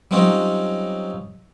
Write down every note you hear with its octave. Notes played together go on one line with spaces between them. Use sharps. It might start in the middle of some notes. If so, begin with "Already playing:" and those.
F#3 G3 C4 C#4 D#4 F4